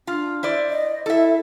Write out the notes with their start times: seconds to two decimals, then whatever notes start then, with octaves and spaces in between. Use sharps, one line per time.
0.07 D4 F4
0.43 E4 C5 D5
0.69 D#5
1.06 E4 A4 E5